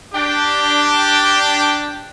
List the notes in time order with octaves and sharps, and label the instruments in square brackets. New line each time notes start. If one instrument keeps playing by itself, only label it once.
[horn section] D4 G4